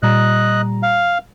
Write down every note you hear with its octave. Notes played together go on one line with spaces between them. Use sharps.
A#2 G3 D#5 A#5 F#6
F5